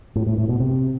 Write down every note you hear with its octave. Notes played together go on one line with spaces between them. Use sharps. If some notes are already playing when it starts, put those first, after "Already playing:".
A2
A2
A2
B2
C3